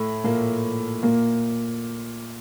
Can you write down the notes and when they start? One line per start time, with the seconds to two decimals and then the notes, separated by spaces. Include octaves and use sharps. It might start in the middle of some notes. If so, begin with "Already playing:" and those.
Already playing: A2 A3
0.24 A#2 A#3
1.03 A#2 A#3